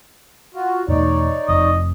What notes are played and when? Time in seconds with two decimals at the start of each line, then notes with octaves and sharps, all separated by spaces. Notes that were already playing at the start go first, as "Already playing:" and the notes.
0.54 F4 F#4
0.88 E2 B2 A3 D#4 C#5 D5
1.48 F1 F2 D#5